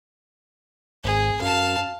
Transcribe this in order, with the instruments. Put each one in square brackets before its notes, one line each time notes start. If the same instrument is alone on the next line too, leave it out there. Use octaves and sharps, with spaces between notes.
[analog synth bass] G#1 [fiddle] G#4
[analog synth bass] F#2 [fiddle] F5 A5